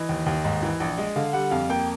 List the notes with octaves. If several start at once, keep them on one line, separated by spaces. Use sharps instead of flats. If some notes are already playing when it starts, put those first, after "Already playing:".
Already playing: E3 D#5
D#2
D#2
G#2
E3
A#1
G#3
D3 F5
G3 F#5
F2 F5
A#3 G5